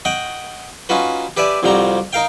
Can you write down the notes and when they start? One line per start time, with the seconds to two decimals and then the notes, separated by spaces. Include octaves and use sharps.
0.05 D#5 F#5 G5 C#6
0.89 C#4 D#4 F4 F#4 B4
1.37 G4 B4 D5 E5 G#5
1.63 C2 F2 F3 G3 F#4 A#5
2.13 D#4 A#4 F5 G5